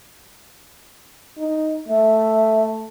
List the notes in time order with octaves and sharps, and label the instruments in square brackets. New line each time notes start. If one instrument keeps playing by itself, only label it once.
[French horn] D#4
[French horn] A3 [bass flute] E5